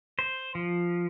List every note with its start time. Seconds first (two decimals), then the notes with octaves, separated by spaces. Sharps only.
0.19 C5
0.55 F3